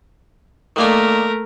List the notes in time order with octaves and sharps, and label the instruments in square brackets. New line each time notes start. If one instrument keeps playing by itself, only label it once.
[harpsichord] D#3 A#3 D4 [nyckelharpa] A3 A#4